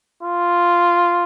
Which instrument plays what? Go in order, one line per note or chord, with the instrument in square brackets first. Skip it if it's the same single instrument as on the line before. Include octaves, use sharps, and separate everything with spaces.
[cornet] F4